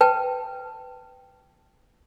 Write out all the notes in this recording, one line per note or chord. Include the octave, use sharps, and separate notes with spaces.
B4 G5 A5